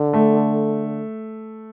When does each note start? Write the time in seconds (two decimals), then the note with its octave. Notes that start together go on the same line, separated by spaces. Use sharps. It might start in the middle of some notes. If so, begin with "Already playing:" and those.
Already playing: D3
0.13 A3